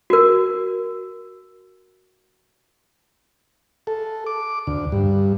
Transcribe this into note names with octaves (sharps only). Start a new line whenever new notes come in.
F#4 A#4
A4
D6
D2
G2